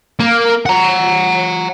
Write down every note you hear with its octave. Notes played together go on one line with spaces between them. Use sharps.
A#3
F#5 A#5